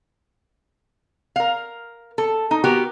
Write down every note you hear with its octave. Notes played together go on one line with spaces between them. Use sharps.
A#4 F5
A4
D#4
B3 F#4 G4 A#4